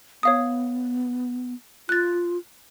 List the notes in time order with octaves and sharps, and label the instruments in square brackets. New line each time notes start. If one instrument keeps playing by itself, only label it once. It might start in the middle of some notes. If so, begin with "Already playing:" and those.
[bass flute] B3 [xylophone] C#5 F5 D#6
[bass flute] F4 [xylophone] F#6 A6